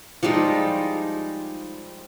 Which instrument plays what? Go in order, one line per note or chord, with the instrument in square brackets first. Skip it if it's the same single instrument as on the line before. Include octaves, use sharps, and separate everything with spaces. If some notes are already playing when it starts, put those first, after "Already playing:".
[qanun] F3 G3 G#3 D#4